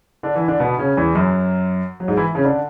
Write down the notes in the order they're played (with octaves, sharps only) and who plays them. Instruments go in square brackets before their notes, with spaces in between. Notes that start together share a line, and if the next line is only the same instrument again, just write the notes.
[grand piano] D3 D4
E3 E4
D3 D4
B2 B3
C#3 C#4
E2 E3
F#2 F#3
F#3
G#2 G#3
E3 E4
C#3 C#4
D3 D4